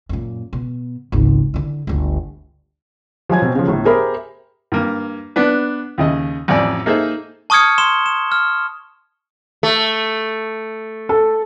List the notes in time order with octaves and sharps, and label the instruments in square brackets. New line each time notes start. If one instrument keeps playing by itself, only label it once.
[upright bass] F#2 A#2
B2
G#1 C#2
D3 E4
G1 D2
[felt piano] F3 F#3 G#5 G#6
B2 C4
C#3 F3
G1 A2
G4 G#4 A#4 C5 E5 B5
[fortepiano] G2 A#3
B3 D4 B4
D#2 C#3 D#5
A1 F2 A2 D5 G#5
A#3 D#4 G#4 A4 C5 E5
[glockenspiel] A5 C#6 D#6 F6 G#6 C#7
C6 E7 G7
E7
F6
[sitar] A3
[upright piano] A4